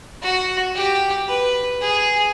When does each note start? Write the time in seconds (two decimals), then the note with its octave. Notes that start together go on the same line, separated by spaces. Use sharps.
0.23 F#4
0.75 G4
1.28 B4
1.81 G#4